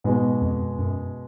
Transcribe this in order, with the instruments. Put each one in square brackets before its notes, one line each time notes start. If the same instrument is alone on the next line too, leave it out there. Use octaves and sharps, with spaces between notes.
[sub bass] G#2 [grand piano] B2 G#3 B3
[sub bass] F2
F#2